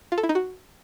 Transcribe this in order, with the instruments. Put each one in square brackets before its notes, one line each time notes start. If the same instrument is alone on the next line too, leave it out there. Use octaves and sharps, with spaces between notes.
[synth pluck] F4
A4
E4
D#4
F#4